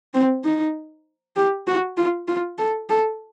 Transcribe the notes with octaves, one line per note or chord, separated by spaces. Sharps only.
C4
D#4
G4
F#4
F4
F4
A4
A4